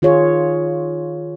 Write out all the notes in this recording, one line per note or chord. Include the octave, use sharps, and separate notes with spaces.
D#3 F4 G#4 C#5